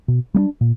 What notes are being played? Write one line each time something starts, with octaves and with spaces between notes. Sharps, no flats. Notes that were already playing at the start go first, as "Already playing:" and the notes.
B2
G3 A#3 D4
A#2